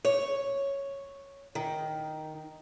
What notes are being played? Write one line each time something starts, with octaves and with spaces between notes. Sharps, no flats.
C#5
D#3